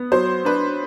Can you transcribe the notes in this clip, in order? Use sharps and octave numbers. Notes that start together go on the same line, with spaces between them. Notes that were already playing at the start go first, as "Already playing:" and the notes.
Already playing: B3
F#3 C5
D4 B4